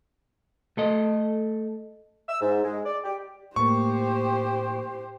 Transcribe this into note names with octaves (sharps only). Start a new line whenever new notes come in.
A3 A4 D#5
E6
G#2
G#3
D5
G4
A2 A#3 G4 C5 C#6